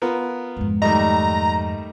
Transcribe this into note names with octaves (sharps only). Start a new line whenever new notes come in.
B3 F4 A#4
F2 G#2
D#3 G3 A3 D#5 A#5